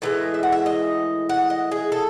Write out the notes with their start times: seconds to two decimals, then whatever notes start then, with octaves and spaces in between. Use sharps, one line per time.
0.02 A2 E3 G#3 D#5
0.34 E5
0.43 F#5
0.52 E5
0.66 D#5
1.29 F#5
1.50 D#5
1.71 G#4
1.92 A4